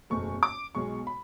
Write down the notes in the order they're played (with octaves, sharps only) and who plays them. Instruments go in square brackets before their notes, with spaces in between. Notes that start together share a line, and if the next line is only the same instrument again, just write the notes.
[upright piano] F#1 E2 B2 F#3 A3 C#6
D6
B1 B2 G#3 C#6
B5